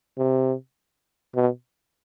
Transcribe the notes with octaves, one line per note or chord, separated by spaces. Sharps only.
C3
B2